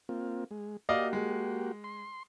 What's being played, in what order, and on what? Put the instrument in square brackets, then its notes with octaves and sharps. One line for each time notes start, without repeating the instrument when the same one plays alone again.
[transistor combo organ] A#3 C4 F4
G#3
[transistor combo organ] A#3 F#4 G4 [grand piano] D5 D#5 F5
[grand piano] G#3
[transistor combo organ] C6